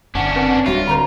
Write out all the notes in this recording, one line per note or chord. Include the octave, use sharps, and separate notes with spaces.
F#1 D3 C#4 D4 F#5
C4 A#4 B4
D1 G3 C4 D4 F4 F#4 C#5 E5
D3 B4 A#5